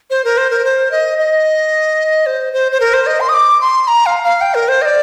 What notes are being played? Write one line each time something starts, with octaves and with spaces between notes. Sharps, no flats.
C5
A#4
C5
A#4
C5
D#5
D#5
C5
C5
C5
A#4
C5
D#5
C6
D#6
D6
C6
A#5
F5
F5
G5
A#4
C5
D#5
D5